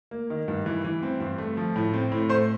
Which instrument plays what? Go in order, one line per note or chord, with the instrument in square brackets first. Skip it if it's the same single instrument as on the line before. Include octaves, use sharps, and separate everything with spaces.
[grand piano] A#3
D#3
G2
E3
E3
C4
G2
A3
F3
A2
C4
A2
A3 C5 C6